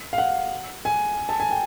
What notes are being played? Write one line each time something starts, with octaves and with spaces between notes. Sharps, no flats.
F5
F#5
G#5
A5
G#5
G5